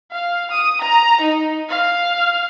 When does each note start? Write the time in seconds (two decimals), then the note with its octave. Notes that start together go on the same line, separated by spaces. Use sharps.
0.12 F5
0.51 D#6
0.81 A#5
1.21 D#4
1.69 F5